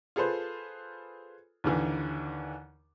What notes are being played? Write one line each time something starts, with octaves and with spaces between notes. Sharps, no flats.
F4 G#4 A4 B4 C5
D#2 D3 E3